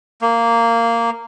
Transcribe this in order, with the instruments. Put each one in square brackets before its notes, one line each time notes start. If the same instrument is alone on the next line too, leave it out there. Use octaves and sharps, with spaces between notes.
[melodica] A#3